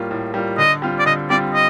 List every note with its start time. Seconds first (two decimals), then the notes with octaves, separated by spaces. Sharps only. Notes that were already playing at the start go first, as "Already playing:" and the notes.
Already playing: A2 G3 A#3 F4
0.11 A2
0.34 G3 A#3 F4
0.58 D3 D#5
0.82 G3 C4 F4
0.99 D5
1.06 D3 D#5
1.30 G3 C4 F4 D5
1.54 D#5